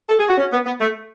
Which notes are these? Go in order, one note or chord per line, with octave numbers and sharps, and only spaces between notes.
A4
G#4
F#4
C#4
B3
B3
A3